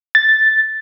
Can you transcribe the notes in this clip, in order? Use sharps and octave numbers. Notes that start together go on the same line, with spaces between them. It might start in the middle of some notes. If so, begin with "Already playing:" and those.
A6